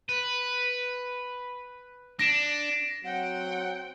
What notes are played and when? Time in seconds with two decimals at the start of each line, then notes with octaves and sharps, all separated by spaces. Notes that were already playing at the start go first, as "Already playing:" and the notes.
0.09 B4
2.19 D4 A#6 D7 E7
3.04 F#3 C4 F#5 G5